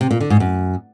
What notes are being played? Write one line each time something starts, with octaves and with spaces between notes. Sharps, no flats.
C3
A#2
D3
G#2
F#2